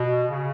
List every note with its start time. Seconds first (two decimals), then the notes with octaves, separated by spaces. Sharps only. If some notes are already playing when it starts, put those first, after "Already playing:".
Already playing: B2
0.30 C#3